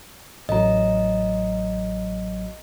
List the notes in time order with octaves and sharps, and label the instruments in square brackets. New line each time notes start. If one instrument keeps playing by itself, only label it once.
[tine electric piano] A1 F#3 [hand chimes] D#5 A#5